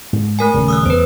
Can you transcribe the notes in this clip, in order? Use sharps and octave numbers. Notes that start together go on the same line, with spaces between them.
G#2
A3 A#4 G#5
D#1 C#3
D#6 E6 F#6
E2 A3 B4 C5